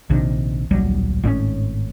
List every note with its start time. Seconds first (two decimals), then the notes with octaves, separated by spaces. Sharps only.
0.10 A#1 C3 D#3 D4
0.71 D1 A#1 F#3 G3
1.23 G#1 A2 D3 C#4